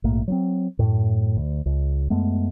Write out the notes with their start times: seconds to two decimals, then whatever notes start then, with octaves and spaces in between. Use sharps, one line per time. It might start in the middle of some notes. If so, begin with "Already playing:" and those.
0.04 A#1 G#2 A3 A#3
0.28 F#3 B3 C4
0.79 F#2 A2
1.37 D2
1.66 C#2
2.10 F#2 G#3 A3 B3